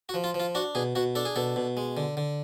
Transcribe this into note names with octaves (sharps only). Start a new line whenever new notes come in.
F#4
F3
F4
F3
F4
D4 F#4
B2 G#4
B2 F#4
D4 A4
G#4
B2 A4
B2
G#3
D3
D3